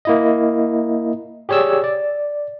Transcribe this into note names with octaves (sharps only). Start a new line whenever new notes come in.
A#3 E4 D#5
G4 G#4 C#5 D5 E6
D5